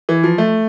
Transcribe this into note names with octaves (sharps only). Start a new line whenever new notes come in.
E3
F3
A3